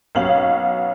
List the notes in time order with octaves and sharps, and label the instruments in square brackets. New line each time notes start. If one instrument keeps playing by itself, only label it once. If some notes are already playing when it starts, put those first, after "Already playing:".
[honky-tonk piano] B1 B3 C#4 F5 F#7